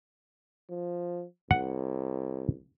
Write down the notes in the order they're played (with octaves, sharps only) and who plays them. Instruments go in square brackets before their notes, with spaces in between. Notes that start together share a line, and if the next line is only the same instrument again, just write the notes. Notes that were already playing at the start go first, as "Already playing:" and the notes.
[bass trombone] F3
[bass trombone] C2 [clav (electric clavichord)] F#5